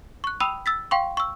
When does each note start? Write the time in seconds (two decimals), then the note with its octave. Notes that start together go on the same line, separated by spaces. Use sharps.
0.24 C#6 F#6
0.40 G5 B5 D#6 E6 D#7 F7
0.66 E6 A6 B6
0.91 F5 G5 C6 C#6
1.17 C#6 E6